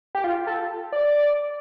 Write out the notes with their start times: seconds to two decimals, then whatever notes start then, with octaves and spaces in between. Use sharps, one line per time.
0.15 G4
0.24 F4
0.47 A4
0.92 D5